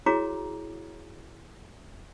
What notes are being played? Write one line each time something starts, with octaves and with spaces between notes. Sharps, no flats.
E4 F#4 G#4 C#5 A#5 D6